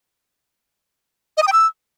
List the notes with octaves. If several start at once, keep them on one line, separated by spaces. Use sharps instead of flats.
D#5
D#6
G5
E6